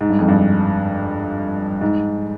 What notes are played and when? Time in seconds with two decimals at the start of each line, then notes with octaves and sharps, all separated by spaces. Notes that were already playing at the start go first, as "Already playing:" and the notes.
0.01 G#2
0.10 G2
0.19 F2
0.28 G2
1.81 G#2